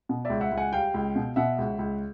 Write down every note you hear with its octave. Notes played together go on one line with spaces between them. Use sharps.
B2
C#2 D5 E5
E5 F#5
C#2
F#5 G#5
G3 F5 G5
C#2
B2
B2 E5 F#5
C#2
C#2